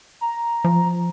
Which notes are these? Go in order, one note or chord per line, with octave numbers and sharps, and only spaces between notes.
A#5
F3